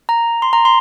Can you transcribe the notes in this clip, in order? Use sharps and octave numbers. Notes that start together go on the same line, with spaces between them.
A#5
C6
A#5
C6